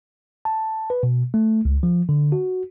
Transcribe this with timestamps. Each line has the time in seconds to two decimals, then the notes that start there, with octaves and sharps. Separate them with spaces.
0.45 A5
0.90 B4
1.03 B2
1.34 A3
1.65 C#2
1.83 F3
2.09 D3
2.32 F#4